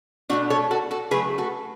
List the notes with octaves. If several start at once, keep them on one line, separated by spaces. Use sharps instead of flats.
B2 F#3 A3 D4 F#4
A4 C#5
F#4 A4
F#4 A4
C#3 F#3 A3 G#4 B4
F#4 A4